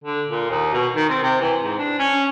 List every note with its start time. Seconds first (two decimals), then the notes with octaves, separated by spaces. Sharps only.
0.04 D3
0.28 A#2
0.50 D#2
0.73 B2
0.96 D#3
1.09 C4
1.23 C3
1.40 E3
1.62 G#2
1.78 D4
1.99 C#4